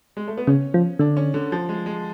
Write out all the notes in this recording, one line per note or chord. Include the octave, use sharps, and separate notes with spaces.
G#3
A3
B3
C#3 C#4
F3
D3 D4
C#4
D3
F3
G#3
G#3